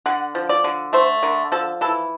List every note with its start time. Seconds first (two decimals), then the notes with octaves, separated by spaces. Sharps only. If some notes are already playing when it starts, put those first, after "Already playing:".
0.06 D3 F#5
0.35 F3
0.49 D5
0.64 D3
0.93 A3 C5
1.23 D3 A#4
1.52 F3 A4
1.81 E3 A4